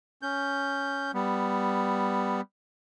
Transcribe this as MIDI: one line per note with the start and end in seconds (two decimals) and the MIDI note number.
0.22 1.11 61
0.22 1.11 91
1.14 2.41 55
1.14 2.41 59